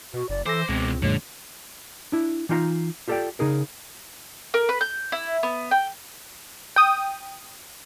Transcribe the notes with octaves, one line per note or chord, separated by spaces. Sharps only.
B2 F#4
F#1 D5
E3 A4 C5 D6 A#6
C#2 B2 G#3 C4
F#2 A#2 D3 G#3 C#5
D4 E4
E3 D#4 F4 F#5 A#5
F4 G4 A4 C#5 D5 G5
C#3 D#4 G#4 A#4
A#4
B4
G6
E4
B3
G5
G5 D#6